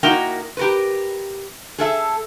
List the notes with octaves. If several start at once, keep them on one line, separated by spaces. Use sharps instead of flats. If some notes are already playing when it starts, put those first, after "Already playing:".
A#3 D#4 E4 F#4 A#4 G5
G4 A#4 B4
G#4 A4 E5